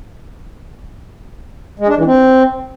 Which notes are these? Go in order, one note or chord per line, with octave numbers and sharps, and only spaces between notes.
G#3
D4
E3
C4